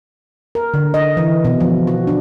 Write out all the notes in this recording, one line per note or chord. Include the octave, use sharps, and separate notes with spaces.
A#4
D3
D#5
E3
B2
F3
F#4
D4